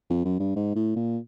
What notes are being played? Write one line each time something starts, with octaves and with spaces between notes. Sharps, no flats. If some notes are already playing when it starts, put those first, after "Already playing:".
F2
F#2
G2
G#2
A2
A#2